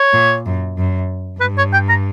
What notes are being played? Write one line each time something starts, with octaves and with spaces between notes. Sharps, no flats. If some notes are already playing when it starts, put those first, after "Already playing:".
Already playing: C#5
A#2
F#2
F#2
G2 B4
C#5
G5
A#5